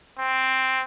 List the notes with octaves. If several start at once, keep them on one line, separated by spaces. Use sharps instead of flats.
C4